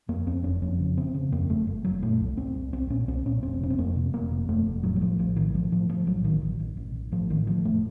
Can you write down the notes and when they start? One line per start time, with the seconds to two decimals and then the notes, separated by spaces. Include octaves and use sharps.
0.08 F2 A#3
0.26 F2 C4
0.44 F#1 C#4
0.62 F2 C#4
0.80 C#3
0.97 C#3 C4
1.15 C#3
1.32 F2 A#3
1.49 F#1 A3
1.67 F#1
1.84 F#1 F#3
2.03 A#2 A3
2.21 C2
2.37 C2 C4
2.55 C2
2.73 C2 C4
2.90 A#2 C#4
3.08 C2 C4
3.26 A#2 C#4
3.43 F1 C4
3.61 C3 C#4
3.70 C4
3.78 F2 A#3
3.96 C3
4.13 F1 A#3
4.31 C3
4.48 F2 A3
4.66 F1
4.83 A2 F#3
4.96 F#3
5.01 A2 F3
5.19 A#1 F3
5.36 A2 D#3
5.54 A2 F3
5.72 A2 F3
5.89 A2 F3
6.07 A#1 F#3
6.24 A1 D#3
6.42 A1
6.60 A1
6.77 A1
6.95 A1
7.12 A2 F3
7.30 A1 D#3
7.47 A2 F3
7.65 F1 A3